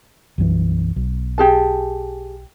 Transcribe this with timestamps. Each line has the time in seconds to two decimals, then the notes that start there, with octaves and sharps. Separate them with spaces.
0.38 B1 F#2 E3
0.96 B1
1.38 G4 G#4 A5